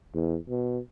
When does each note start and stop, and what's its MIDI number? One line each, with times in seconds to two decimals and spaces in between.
0.14 0.38 40
0.49 0.79 47